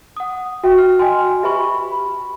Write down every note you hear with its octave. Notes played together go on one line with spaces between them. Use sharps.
F#5 D#6
F#4 E5 G5
F6
D#5 G5 G#5 C6
G4 B4 E5 G#5 B5 C#6
B5